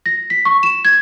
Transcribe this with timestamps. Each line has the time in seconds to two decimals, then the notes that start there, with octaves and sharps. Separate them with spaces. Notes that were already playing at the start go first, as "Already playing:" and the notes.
0.06 A#6
0.30 B6
0.45 C#6
0.63 E7
0.85 G#6